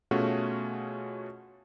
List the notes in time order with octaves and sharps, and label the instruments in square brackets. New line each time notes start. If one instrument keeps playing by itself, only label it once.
[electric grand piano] B2 A3 C#4 F4 F#4 G#4